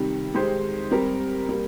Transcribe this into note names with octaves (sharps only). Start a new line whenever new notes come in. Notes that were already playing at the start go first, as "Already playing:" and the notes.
Already playing: C3 D#3 G3
D#3 G#3 D#4 G4 C5
G3 C4 G4 A#4
G3 A#3